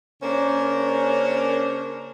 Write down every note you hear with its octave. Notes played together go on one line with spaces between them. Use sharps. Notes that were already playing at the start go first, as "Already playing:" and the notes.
C#3 A#3 C#4 D4 A#4 C5